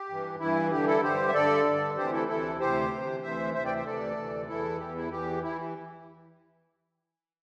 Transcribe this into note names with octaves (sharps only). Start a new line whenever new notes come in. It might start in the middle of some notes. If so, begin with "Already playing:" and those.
Already playing: G4
G2 E3
G2 E3 E4
G2 D3 G4
E4 A4
G2 D3 G4 C5
E5
G2 D3 A4 D5
G2 D3
D2 C3 E3 G4 C5
E4 A4
D2 C3 E3 E4 A4
D2 C3 E3 G4 C5
D2 C3 E3
D2 C3 E3 C5 E5
D2 C3 E3 C5 E5
D5 G5
C5 E5
D2 C3 E3 A4 D5
D2 C3 E3
E2 E3 E4 A4
E2 E3 G4
E4
E2 E3 G4
E3 E4